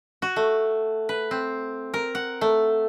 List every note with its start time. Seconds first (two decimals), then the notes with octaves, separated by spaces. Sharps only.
0.22 F#4
0.36 A3
1.09 B4
1.31 C4
1.94 A#4
2.15 F#5
2.41 A3